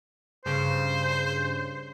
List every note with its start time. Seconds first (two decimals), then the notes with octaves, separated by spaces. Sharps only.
0.45 G2 C#3 C5